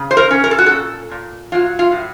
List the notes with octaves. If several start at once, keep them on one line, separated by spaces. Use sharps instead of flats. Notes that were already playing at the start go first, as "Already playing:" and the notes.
Already playing: C#3
C5
A#4
C#4
A#4
A4
F#4
A#2 A4
A#2
F#3 F4
F4
A2